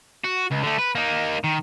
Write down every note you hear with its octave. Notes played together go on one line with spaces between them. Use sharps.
F#4
C#2
D3 A3
B4
A#3 D#4
D#3